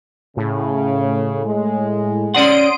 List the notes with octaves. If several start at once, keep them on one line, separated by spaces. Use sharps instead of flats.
A2 C#3
G#3
C#4 D5 F#5 C6 D#6 D7